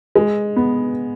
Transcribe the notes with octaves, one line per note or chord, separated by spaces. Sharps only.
G#3
B3